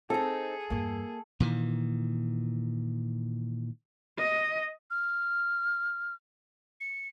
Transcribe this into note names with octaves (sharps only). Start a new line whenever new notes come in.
C4 D#4 G#4 A4
E2 G2 A#3
A#2 D#3 E3
D#5
F6
C#7